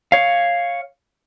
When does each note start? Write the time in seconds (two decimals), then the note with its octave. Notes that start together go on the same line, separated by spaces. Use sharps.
0.12 C#5 F5